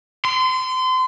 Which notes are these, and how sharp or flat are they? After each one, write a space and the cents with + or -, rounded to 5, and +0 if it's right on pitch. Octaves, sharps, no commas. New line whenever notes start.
C6 -30